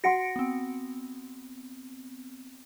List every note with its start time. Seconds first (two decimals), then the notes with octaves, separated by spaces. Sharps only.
0.04 F#4 F#5 C6 A#6 C#7 D7
0.36 B3 C4